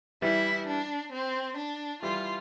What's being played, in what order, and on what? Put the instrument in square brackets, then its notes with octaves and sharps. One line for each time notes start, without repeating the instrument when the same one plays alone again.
[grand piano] E3 G3 [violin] E4
[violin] D4
C4
D4
[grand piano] E3 G3 [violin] F4